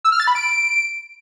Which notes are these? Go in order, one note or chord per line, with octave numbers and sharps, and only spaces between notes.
E6
F6
A6
B5
D7